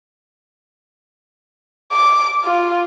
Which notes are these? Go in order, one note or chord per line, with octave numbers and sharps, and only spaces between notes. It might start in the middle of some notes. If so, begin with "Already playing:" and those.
D6
F4